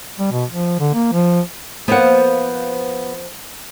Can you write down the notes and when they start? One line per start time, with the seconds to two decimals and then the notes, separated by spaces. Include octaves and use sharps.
0.19 G3
0.31 B2
0.50 F3
0.79 D3
0.94 A#3
1.13 F3
1.88 F3 A#3 B3 F#5